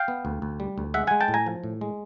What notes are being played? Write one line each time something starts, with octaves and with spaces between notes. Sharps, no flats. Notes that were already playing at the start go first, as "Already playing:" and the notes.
Already playing: F5 G5
B3
D2
D2
G3
D2
G#3 E5 F#5
G#3 F#5 G#5
G5 A5
A2
G#5 A#5
F3
A2
G#3